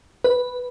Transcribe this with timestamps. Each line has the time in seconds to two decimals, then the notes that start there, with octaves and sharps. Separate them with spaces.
0.24 B4